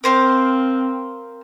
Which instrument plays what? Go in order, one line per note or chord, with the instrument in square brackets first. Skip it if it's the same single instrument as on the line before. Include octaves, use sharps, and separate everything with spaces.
[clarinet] C4 [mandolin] A#4 C5 F5